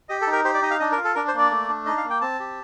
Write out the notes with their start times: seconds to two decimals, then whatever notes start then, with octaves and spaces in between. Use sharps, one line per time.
0.09 G4 D#5
0.21 A4
0.27 D#4
0.33 A#4
0.45 G4 C5
0.54 D5
0.62 D#4 D#5
0.71 F5
0.80 D4 D#5
0.92 A#4
0.97 F4
1.04 A4
1.15 D4 A#4
1.28 C5
1.34 A#3 D5
1.51 A3
1.69 D4
1.86 D#4 D#5
1.97 F5
2.04 A#3
2.10 G5
2.21 C4 A5
2.40 G4